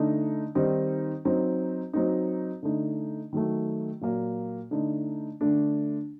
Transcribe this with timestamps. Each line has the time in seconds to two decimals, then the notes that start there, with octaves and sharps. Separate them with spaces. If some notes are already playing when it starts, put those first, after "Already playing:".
Already playing: D3 A3 D#4
0.55 D#3 G3 C4 D#4
1.25 F#3 C4 D#4
1.93 F#3 C4 D#4
2.63 D3 A3 D#4
3.33 D#3 F#3 A3
4.01 A#2 F#3 A#3
4.71 D3 A3 D#4
5.41 D3 A3 D4